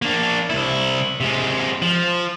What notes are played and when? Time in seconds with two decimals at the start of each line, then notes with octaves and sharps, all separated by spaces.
0.02 A#3 D4
0.50 C2 E4
1.21 C3 G#3
1.82 F3